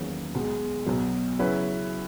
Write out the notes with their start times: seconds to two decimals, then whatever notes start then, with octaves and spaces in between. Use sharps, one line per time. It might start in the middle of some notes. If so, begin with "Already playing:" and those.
Already playing: E2 D#3 F#3 A#3 C#4
0.35 B1 B2 G#3
0.86 B1 B2 F#3
1.39 C#3 F#3 C#4 E4 B4